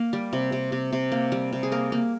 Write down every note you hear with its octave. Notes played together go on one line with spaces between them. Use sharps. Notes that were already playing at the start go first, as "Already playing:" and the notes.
Already playing: A#3
G3
C3
C3
C3
C3
A#3
G3
C3
G#4
A#3 A#4
A#3